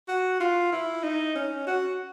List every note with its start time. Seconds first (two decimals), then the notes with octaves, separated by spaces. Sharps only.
0.08 F#4
0.41 F4
0.73 E4
1.03 D#4
1.36 C#4
1.67 F#4